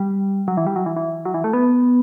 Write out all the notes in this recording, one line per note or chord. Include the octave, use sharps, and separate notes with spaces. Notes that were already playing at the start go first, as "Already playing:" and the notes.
Already playing: G3
F#3
E3
G3
F#3
E3
E3
F#3
E3
A3
B3